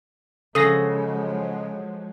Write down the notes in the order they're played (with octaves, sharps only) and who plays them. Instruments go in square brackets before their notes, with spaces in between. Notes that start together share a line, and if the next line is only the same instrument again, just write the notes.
[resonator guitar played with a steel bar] C#3 [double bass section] F3 F#3 G#3 [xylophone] A4 C7 [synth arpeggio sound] D#6 A#6